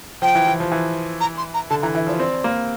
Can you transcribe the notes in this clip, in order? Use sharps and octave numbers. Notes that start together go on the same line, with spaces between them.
F3 G5
E3
E3
F3
E3
A#5
C6
A#5
D3 A5
E3 A#5
E3 E5
F3 D5
C4 D5
A#3